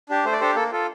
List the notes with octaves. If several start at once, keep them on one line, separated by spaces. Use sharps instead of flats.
D4 G4
A3 C5
D5
D4 G4 A4 C5
A#3 A4
F4 A4